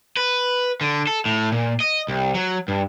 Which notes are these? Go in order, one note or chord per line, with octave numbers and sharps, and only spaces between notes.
B4
D3
A4
A2
A#2
D#5
C2
F#3
G2